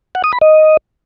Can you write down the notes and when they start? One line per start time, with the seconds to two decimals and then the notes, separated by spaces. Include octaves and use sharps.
0.15 F#5
0.24 D#6
0.33 B5
0.41 D#5